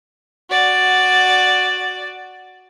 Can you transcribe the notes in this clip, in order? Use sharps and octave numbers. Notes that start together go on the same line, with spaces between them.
F#4 D5